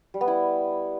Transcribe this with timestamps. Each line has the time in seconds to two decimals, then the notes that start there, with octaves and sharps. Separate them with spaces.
0.14 G3
0.21 B3
0.28 E4